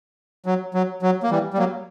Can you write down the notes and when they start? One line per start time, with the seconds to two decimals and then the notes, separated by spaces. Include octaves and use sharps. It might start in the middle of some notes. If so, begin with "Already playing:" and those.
0.46 F#3
0.74 F#3
1.02 F#3
1.23 A#3
1.30 E3 G3
1.54 G3
1.58 F#3 A#3